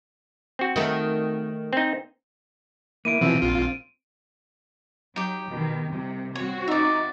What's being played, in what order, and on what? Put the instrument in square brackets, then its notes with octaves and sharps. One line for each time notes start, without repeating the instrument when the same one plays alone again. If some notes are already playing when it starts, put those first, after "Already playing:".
[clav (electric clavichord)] C4 F#4
[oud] D#3 A3
[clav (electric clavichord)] C4 D#4
[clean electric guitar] A#3 E4 [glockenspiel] D7 D#7
[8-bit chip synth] B2 E3 F3 [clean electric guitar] C4
[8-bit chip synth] A#1 F4
[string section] F#3 [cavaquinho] D#4 G4
[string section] B2 D#3
C2 C3
[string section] C4 F#4 [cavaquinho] C#5
[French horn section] D#4 [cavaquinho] D5 E5